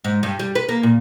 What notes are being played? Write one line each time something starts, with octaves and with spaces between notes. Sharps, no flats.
G#2
G2
G3
B4
A#3
A#2